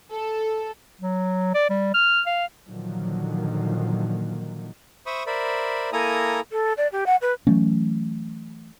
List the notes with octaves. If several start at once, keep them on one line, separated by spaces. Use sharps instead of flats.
A4
F#3
D5
G3
F6
F5
A#2 D3 D#3 F3 F#3 A#3
C5 E5 B5 C#6 D#6
A#4 C5 D5 E5 B5
A#3 E4 A4 G#5 A#5 D#6
A4
D5
G4
F#5
B4
E3 F#3 A3 C#4